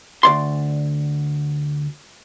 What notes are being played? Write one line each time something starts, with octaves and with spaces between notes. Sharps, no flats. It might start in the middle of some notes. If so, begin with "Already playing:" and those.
D2 D5 C6